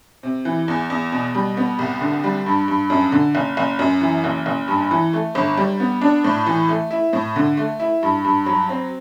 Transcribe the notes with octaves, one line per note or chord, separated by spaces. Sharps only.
C3
E3
E2
E2
B2
G3
B3
C2
D3
G3
G2
G2
F#2
D3
F#1
F#1
F#2
E3
F#1
F#1
G2
E3
A3
G1
G3
B3
D4
A2
E3
A3
E4
A2
D3
A3
E4
G2
G2
F#3
C4